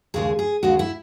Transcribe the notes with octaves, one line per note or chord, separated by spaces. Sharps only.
D#2 C#3 G#3 G#4
G#4
D#2 C#3 G#3 F#4
E4